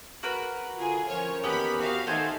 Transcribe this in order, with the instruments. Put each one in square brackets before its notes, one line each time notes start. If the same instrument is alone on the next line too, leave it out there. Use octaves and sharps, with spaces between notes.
[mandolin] F#4 A#4 B4
[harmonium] D3 F4 [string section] G#4
[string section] F3 C#5 [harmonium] C#4 A#4 C5
[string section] D#2 B5 [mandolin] B3 G4 B4
[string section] F#4 F5
[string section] D#3 A3 [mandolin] A4 C5 G#5 [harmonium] F#5